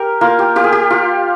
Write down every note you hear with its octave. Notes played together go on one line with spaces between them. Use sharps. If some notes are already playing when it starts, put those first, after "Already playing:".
Already playing: G4 A#4
A#3 F4
G4
F4 G4
G#4
G4
F4